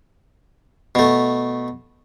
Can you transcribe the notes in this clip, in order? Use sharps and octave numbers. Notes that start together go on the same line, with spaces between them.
B2 A3